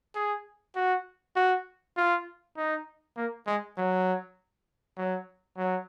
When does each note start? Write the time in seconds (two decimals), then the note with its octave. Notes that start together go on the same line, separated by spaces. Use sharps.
0.15 G#4
0.75 F#4
1.36 F#4
1.97 F4
2.57 D#4
3.17 A#3
3.47 G#3
3.77 F#3
4.97 F#3
5.58 F#3